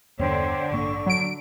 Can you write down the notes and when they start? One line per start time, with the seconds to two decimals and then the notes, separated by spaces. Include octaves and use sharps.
0.19 E2 G2 D3 B3 C5 C#5 G5
0.71 A1 G2 A#3 C#6
1.06 F#3 D7